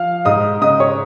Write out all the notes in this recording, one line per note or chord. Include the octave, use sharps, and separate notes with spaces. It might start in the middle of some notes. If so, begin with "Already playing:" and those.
Already playing: F3 F5 F6
G#2 D#5 D#6
C#3 D#5 D#6
C#5 C#6